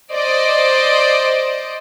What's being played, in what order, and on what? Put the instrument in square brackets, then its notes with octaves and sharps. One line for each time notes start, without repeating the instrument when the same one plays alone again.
[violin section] C5 D5 D#5